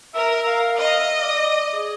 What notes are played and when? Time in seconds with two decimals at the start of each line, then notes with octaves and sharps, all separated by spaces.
0.15 A#4 E5
0.37 E5
0.46 F5
0.78 D#5 F5
0.99 E5
1.21 D5
1.42 D5
1.73 G#4